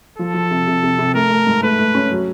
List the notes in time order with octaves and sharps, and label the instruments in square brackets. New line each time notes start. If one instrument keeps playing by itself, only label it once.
[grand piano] F3 [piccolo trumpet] A4
[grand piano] F3
C3
C3
C3
C3
[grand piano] A3 [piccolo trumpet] A#4
[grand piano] A3
G#2
[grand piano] A3 [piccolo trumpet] B4
[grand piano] A3
C#4
F#3